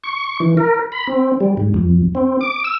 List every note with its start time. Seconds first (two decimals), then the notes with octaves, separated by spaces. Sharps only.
0.04 C#6
0.40 E3
0.57 A#4
0.92 B5
1.07 C4
1.40 G3
1.57 G#2
1.74 F2
2.15 C4
2.41 D6
2.64 E6